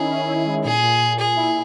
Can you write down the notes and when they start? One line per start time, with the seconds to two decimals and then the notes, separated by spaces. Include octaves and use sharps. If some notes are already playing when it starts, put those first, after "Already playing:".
Already playing: D#3 C#4 E4 G#4
0.10 C#4
0.28 E4
0.46 G#3
0.64 A#2 G#4
0.83 A#2
1.01 A#2
1.19 A#2 G#4
1.36 E4